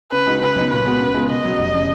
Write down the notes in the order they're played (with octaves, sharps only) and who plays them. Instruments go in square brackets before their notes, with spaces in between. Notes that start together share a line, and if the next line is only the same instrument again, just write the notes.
[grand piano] C#3 [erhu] B4
[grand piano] G#3 D#4 F#4
[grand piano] C#3 [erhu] B4
[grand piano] F#3 B3 D#4
[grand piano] A#2 [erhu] B4
[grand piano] G#3 B3 F#4
C#3
G#3 B3 F4 A#4
[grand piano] B2 [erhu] D#5
[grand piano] F#3 C#4 F#4
F1
C#3